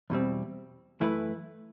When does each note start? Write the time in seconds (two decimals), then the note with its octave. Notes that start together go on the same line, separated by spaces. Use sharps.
0.10 E2 B2 G3 C4
1.00 F#2 E3 A3 E4 B4